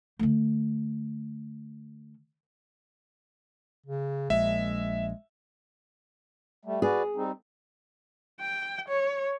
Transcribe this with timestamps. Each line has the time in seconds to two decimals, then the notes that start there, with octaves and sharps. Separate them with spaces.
0.19 D3 A3
3.86 C#3
4.30 A#1 G#3 E5
6.65 G3 A3
6.82 F#4 G#4 B4 D5
7.16 G3 C4 D#4
8.40 G5
8.89 C#5